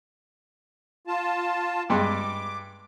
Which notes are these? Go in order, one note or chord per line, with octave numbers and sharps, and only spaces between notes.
F4 A5
G2 G#3 C6 D6